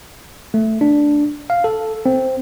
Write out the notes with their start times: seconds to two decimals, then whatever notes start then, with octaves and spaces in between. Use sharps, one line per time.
0.54 A3
0.81 D4
1.50 F5
1.64 A4
2.06 C4